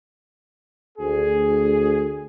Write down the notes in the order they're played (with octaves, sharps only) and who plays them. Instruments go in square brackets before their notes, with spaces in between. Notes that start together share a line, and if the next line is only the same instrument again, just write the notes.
[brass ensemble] D2 G#4